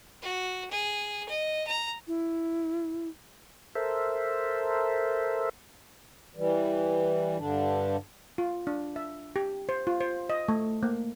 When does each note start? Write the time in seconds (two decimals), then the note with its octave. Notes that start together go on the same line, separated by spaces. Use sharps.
0.22 F#4
0.70 G#4
1.28 D#5
1.67 A#5
2.07 E4
3.75 A4 A#4 C5 E5
6.36 E3 G3
7.38 G2 D3 D4
8.38 F4
8.67 D4
8.96 E5
9.36 G4
9.69 C5
9.87 F4
10.00 C5
10.30 D#5
10.49 A3
10.83 A#3